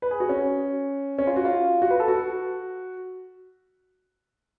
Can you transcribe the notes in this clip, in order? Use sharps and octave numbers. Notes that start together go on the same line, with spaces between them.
B4
G#4
F#4
C#4
C#4
F4
F#4
F4
F#4
B4
A4
F#4